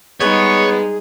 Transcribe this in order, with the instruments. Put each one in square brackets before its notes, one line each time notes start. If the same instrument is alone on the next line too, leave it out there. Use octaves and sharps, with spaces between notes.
[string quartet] G3 G#3 D#4 [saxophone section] B3 [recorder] G#4 [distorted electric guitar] C#5